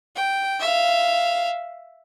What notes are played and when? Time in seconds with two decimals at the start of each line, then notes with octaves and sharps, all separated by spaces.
0.16 G5
0.60 E5 F5